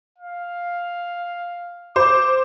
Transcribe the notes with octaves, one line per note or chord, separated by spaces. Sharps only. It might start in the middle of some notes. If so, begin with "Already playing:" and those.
F5
C5 D6